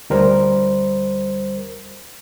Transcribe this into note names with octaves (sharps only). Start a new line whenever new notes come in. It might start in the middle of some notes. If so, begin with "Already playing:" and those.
D2 G3 A#4 C5